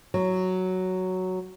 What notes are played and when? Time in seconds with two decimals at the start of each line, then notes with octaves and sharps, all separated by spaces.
0.14 F#3